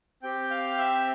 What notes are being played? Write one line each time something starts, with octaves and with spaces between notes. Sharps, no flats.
C4 G4 G5
F5
E5